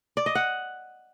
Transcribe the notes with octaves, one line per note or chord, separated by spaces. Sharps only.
D5
D#5
F#5